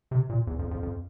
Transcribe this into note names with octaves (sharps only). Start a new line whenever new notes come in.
C3
A#2
E2
F2
F2
F2